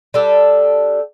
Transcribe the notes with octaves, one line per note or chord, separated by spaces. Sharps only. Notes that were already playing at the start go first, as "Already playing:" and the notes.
G3 D4 A4